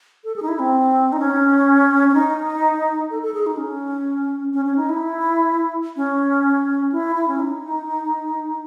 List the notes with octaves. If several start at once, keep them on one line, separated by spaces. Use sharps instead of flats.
A4
G#4
D#4
E4
C4
D#4
C#4
C#4
D#4
A4
A4
G#4
D#4
C#4
C#4
C#4
D#4
E4
C#4
E4
E4
C#4
D#4